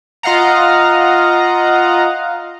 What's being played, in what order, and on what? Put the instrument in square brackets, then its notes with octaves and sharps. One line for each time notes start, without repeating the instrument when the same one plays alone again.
[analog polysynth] F4 D#5 F5 F#5 A#5